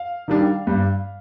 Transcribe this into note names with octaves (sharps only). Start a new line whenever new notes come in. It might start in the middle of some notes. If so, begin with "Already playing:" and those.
Already playing: F5
D#3 G3 D4
G2